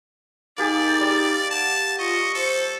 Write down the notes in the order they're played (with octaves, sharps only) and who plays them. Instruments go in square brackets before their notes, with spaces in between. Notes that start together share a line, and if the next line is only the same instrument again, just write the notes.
[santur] A#3 G4 G#4 [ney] D#4 [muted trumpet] D5 [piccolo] A6
[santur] G3
[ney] F#5 [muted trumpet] A5
[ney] F4 [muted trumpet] D#5 [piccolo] C#6
[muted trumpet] A4 [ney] C5